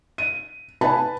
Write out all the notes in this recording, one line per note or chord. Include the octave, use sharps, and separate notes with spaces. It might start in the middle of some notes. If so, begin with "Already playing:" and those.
D#7
B4 G#5 A5 B5